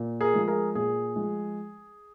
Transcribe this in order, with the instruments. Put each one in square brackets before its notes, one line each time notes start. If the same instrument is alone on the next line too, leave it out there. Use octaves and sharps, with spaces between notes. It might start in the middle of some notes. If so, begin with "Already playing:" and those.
Already playing: [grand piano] A#2
G#4 A#4
F3 G#3
G#4 A#4
A#2 G#4
F3 G#3